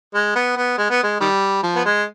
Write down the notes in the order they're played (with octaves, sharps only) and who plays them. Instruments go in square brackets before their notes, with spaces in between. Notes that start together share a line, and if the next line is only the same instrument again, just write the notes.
[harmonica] G#3
B3
B3
G#3
B3
G#3
D#3 G3
F3
B3
G#3